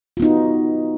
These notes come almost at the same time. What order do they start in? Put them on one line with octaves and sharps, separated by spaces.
F4 B3 D#4 F#4